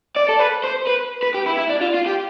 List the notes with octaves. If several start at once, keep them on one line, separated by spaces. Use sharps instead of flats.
D5
A4
B4
C5
B4
B4
G4
E4
E4
D4
F4
F4
G4